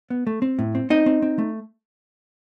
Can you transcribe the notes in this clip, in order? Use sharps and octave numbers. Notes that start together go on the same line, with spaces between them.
B3
A3
C4
A2
C4
C4 D#4 D#5
C4
C4
A3